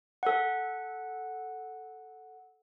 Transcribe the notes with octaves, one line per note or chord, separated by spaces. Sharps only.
A4 F#5